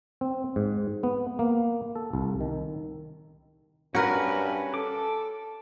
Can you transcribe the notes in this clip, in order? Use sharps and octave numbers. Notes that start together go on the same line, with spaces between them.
C4
G#2
B3
A#3
A4
C2
D#3
G2 C#4 F#4 A#4 B4
A4 D6